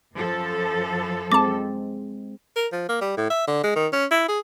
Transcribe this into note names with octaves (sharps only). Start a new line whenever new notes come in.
F#2 F3 A4
G#3 C4 A5 D6 A6
A#4
F3
A#3
G3
A2
E5
D3
G#3
D#3
C#4
E4
G#4